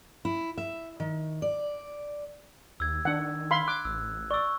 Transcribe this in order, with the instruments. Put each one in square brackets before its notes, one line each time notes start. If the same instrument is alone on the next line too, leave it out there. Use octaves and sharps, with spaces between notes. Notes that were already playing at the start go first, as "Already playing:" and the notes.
[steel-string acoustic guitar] E4
E5
D#3
D5
[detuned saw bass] D#2 [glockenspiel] E6 G#6
[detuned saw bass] D#3 [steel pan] D4 F#5
[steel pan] F5 B5 C6
[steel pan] D6 [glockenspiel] F#6
[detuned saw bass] A1 [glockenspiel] E6
[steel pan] D5 [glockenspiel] C#6 E6